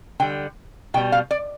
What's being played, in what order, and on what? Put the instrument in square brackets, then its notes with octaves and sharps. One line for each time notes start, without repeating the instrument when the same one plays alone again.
[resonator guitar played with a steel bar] D3 G3 G5
B2 G5
G3
F5
D5